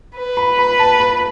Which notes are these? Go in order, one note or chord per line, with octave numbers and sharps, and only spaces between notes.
B4
B5
B5
A5
B5